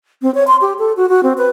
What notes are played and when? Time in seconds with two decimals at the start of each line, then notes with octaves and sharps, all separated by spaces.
0.22 C4
0.35 C#5
0.47 C6
0.61 G4
0.79 A4
0.97 F#4
1.09 F#4
1.23 C4
1.38 B4